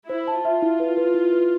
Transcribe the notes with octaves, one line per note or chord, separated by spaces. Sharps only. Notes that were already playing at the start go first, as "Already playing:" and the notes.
E4 C5
A5
F4 E5
E4
B4
B4
E4
B4